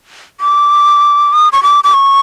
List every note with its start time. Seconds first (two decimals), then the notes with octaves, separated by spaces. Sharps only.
0.40 D6
1.33 D#6
1.53 C#6
1.63 D6
1.84 D6
1.94 C#6